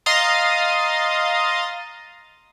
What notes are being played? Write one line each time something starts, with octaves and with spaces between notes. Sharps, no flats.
D#5 F5 A#5 C6 D#6 A6